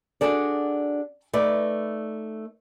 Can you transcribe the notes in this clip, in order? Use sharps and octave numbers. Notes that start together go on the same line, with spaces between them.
D4 F#4 G#4 A4 D5
A3 D#4 B4 D5